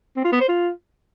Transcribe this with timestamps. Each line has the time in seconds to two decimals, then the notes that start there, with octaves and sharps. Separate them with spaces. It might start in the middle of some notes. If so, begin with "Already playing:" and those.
0.16 C4
0.24 F4
0.33 B3
0.41 C5
0.49 F4